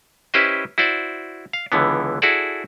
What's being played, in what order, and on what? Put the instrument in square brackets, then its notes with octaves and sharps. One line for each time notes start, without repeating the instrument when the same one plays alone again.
[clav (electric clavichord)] C#4 E4 G4 B4 C5 D#5
E4 F#4 C5 D5
F5
C#2 D3 E3 B3
E4 F#4 G#4 A4 D5